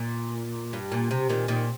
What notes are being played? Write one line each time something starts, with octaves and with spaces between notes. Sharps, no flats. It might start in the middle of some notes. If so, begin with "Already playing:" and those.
Already playing: A#2
G2
A#2
C3
A#2 D#3
A#2 D#3